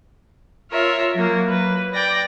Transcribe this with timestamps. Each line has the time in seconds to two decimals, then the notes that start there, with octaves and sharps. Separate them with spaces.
0.71 F4 A#4 C#5 E5
1.13 F#3 A#3
1.49 B4
1.94 D5 G5 A#6